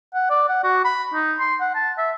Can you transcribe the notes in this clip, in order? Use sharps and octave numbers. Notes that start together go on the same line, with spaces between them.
F#5
D5
F#5
F#4
B5
D#4
C6
F#5
A5
E5